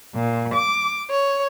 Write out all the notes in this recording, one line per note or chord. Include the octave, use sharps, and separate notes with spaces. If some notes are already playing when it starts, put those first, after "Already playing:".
A#2
D6
C#5